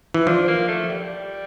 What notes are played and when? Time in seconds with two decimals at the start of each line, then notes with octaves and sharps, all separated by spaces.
0.14 E3
0.27 F3 D4
0.48 A#3
0.68 A3
0.88 G3